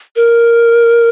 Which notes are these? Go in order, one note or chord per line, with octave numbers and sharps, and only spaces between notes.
A#4